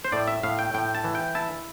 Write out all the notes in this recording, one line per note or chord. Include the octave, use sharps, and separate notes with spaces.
C5
A2 D5
E5
A2 F5
G5
A2 G5
A5
E3
G5
E4 A5